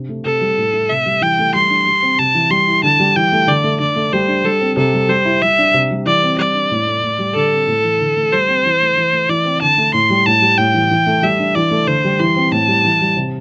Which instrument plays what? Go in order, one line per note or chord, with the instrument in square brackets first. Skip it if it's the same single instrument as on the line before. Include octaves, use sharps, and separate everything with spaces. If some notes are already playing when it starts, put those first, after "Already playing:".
Already playing: [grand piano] C3 D4
A3
[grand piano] C3 [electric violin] A4
[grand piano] G3
A2
A3
[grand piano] C3 [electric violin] E5
[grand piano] G3
[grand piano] E3 [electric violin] G5
[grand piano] A3
[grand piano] G3 [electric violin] C6
[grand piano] D4
G3
C4
[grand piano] C3 [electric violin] A5
[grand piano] E3
[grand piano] G3 [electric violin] C6
[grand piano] E4
[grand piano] D3 [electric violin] A5
[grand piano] G3
[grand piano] E3 [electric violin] G5
[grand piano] A3
[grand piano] D3 [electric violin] D5
[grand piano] A3
[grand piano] D3 [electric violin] D5
[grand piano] A3
[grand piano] G3 [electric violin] C5
[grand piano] D4
[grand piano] G3 [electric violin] A4
[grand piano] C4
[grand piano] C3 [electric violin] A4
[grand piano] G3
[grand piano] G3 [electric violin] C5
[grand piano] E4
[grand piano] G3 [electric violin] E5
[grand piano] D4
C3
G3
[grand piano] E3 [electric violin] D5
[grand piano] C4
[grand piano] G3 [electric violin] D5
[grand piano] D4
A2
A3
A2
G3
[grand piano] D3 [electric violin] A4
[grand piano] C4
A2
E3
D3
A3
[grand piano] G3 [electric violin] C5
[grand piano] C4
E3
A3
E3
A3
[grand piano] E3 [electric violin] D5
[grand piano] C4
[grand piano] D3 [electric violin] A5
[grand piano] A3
[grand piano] A2 [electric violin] C6
[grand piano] G3
[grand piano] A2 [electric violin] A5
[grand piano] G3
[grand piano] A2 [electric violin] G5
[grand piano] E3
E3
A3
[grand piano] G3 [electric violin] E5
[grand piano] D4
[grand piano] E3 [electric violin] D5
[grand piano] A3
[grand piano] D3 [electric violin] C5
[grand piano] G3
[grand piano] E3 [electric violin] C6
[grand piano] C4
[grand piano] A2 [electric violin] A5
[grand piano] G3
E3
G3
C3